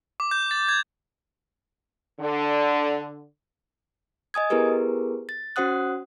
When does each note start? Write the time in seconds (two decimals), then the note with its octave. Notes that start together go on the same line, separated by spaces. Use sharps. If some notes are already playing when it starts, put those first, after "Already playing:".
0.20 D6
0.31 G6
0.51 A6
0.69 G#6
2.20 D3
4.34 D#5 G#5 D#6 G#6
4.50 B3 E4 G4 G#4 A#4 B4
5.29 A6
5.56 C#4 F#4 C5 F#5 D#6 F#6